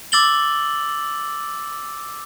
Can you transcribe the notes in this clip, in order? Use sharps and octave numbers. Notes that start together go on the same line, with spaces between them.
D6 E6 A6 F#7 G7